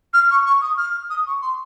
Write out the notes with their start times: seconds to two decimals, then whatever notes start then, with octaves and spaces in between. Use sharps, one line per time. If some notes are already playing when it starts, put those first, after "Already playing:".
0.14 F6
0.31 C#6
0.46 C#6
0.61 D#6
0.78 F6
1.10 D#6
1.27 C#6
1.42 C6